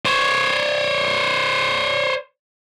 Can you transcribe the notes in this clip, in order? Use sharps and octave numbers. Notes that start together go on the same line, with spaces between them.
C5 C#5